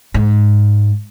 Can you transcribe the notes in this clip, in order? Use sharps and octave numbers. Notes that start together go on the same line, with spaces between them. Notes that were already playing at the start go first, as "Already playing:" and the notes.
G#2